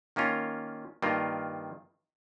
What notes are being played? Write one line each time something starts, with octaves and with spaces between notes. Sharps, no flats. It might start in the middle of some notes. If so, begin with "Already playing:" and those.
D#3 A#3 C#4 F4
G2 D#3 A#3 F4